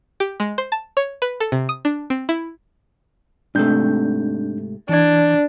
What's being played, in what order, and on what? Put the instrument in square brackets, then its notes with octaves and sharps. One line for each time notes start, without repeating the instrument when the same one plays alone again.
[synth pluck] G4
G#3
C5
A5
C#5
B4
A4
C3
D#6
D4
C4
E4
[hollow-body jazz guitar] G#2 C3 A3 [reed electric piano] D4 G6
[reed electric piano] E3 G#6 [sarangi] D4